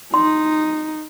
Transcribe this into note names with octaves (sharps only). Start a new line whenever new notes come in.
D#4 C6